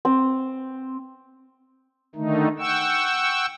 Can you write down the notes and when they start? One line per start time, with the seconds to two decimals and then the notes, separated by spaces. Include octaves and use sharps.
0.05 C4
2.15 D3 D#3 A3 D#4
2.59 F#5 G5 C#6 E6